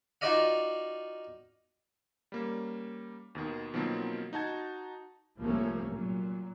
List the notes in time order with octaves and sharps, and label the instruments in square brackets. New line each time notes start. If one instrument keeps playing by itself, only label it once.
[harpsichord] D#4 F4 F#4 D5 D#5 F5
[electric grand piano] G3 A#3 C#4
D#2 B2 D#3
B2 D#3 F3 F#3 A#3 C4
D#4 F#4 A5 G#6
[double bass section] C2 F3 A3 A#3 C#4
A#2 F#3